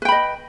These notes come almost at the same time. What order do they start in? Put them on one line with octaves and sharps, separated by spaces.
B4 G5 B5 D#5